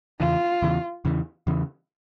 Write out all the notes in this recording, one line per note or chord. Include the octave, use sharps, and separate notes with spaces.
E2 C#3 E3 F4
E2 C#3 E3
E2 C#3 E3
E2 C#3 E3